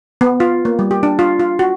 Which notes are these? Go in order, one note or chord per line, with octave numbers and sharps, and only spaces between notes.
B3
F4
A#3
G3
G4
D4
F4
F4
F#4